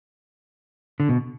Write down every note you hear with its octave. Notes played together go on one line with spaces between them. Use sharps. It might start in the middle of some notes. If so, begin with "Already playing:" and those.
D3
B2